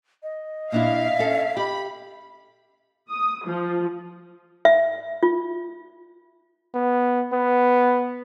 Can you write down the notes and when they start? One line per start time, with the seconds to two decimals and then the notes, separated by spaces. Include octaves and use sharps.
0.23 D#5
0.72 A#2 D4 E4 E5 F5
1.19 C#4 A4
1.57 G4 B5
3.09 D#6
3.45 F3
4.65 E5
5.23 F4
6.74 B3
7.33 B3